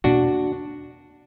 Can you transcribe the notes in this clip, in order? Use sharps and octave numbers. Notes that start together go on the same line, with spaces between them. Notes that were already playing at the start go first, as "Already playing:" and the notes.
E2 B2 A#3 D4 F#4